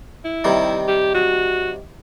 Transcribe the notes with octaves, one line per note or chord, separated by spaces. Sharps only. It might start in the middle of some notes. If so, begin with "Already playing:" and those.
E4
C3 D#3 G3
G4
F#4